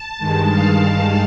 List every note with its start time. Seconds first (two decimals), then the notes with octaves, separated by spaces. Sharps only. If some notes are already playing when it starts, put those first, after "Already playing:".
Already playing: A5
0.18 G2 D#3 G#3
0.50 F5